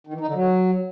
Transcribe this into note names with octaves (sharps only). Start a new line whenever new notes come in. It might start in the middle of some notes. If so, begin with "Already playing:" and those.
D#3
E3
D#4
D3
F#3